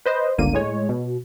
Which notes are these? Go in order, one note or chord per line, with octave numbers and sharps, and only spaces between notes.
B4 C5 D#5
G1 C#2 D3 A#3 D#7
A2 G#3 C#5
B2